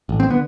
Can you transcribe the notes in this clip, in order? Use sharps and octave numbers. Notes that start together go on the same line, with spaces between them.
A1
C4
D3 B3